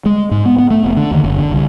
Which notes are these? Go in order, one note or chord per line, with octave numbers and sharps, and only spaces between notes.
G#3
G#2
B3
B3
A3
F1
D3
D#2
F#1
D3
C2